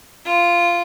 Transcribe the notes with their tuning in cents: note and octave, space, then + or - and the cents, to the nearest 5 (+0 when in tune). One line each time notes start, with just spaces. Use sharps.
F4 -10